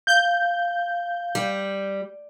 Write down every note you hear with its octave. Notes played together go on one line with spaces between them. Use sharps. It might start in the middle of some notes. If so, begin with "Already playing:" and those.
F5 G6
G3